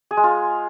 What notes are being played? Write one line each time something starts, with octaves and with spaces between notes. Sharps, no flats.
G#4
G#3
F4